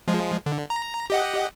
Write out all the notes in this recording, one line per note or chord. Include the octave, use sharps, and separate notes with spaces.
F3 G#3
D3
A#5
G4 D#5 F#5